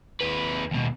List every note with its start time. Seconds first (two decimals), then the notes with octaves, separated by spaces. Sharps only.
0.21 D#2 B4
0.71 D#2 B2